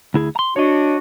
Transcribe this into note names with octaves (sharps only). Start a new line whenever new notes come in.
D2 E4 G#4
A#5 C6
D4 F#4 C#5 D#5